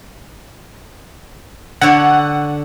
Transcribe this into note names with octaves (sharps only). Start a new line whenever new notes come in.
D3 C#5 F#5